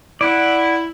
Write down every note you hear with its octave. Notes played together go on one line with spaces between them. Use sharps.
E4 D5 F#5